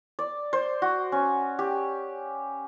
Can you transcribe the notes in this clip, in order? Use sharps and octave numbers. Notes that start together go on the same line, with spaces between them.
D5
C5
F#4
C#4
G4